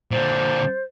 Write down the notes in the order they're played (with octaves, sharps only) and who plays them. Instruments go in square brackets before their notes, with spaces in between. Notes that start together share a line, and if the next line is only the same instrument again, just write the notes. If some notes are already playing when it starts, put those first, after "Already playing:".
[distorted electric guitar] A#2 D3 [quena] C5